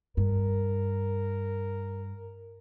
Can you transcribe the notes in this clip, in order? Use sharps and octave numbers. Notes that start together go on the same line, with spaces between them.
G2 A#4